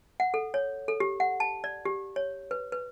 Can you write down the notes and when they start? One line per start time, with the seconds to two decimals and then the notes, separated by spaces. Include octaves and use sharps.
0.20 F#5
0.34 A4
0.54 C#5
0.88 A4
1.00 G4
1.20 F#5
1.40 A5
1.64 D5
1.85 G4
2.16 C#5
2.51 B4
2.72 B4